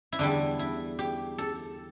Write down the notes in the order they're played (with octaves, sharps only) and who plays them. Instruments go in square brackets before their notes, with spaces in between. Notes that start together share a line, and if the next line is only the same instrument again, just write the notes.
[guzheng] E4
E2 D3 G3 D4
E4
G4
A4